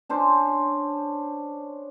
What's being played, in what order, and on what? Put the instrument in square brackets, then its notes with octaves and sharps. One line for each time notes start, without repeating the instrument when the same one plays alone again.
[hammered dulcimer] C#4 D4 C5